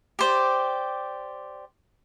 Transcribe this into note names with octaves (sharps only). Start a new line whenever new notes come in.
G4 C5 D5